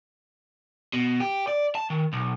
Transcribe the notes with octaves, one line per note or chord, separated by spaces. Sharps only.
B2
G4
D5
A5
D#3
B1